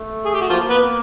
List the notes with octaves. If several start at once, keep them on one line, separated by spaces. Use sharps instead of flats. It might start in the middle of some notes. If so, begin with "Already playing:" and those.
Already playing: A3
G#4
G4
F#4
F3 A#3 F4
B3 B4